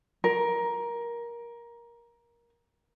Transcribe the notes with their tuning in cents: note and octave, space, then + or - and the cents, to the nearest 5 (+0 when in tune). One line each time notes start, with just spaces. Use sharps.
A#4 +15